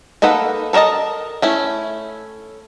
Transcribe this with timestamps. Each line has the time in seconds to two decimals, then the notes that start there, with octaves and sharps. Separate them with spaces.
0.22 A#3 D#4 A4 B4 F#5
0.73 A4 A#4 C#5 D#5 A5
1.42 A3 C#4 E4